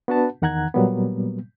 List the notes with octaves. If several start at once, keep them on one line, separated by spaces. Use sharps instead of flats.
B3 D4 F#4 B4 F#5 A5
E2 D#3 F#5 A#5 F#6 G#6
A#2 F#3 G3 A#3 B3